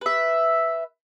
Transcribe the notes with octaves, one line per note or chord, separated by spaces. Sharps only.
B4 E5